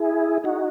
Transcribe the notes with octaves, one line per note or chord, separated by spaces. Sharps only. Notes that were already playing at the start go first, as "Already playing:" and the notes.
Already playing: E4 G#4
D#4 F#4